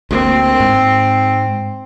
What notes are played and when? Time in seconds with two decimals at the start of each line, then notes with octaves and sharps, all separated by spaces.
0.11 D2 G#3 A#3 C4
0.60 G#2